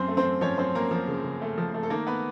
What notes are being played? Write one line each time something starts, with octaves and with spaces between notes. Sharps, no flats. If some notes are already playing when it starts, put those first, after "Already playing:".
Already playing: F#2 C4 C5
A3
C4 C5
F#2
F3 C#4 C#5
F#2 C4 C5
F#2 A#3 A#4
F3
C#3
C#3
A3
F3
A3
A4
D#3 A#3 A#4
B3 B4